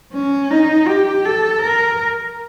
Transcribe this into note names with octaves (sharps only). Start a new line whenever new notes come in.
C#4
D#4
G4
A4
A#4